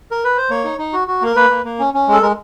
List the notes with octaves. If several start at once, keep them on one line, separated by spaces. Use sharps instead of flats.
A#4
B4
C5
A#3 C#5
D#4
D#4
F#4
F#4
A#3 A#4
A#3 B4
A#3
A#3
C#4
C#4
G#3 A4
G#3 A#4